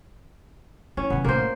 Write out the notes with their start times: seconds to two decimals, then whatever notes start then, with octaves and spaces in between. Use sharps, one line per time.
0.97 C#4 E4
1.10 C3 E3 B3
1.25 A1 A3 A#3 C5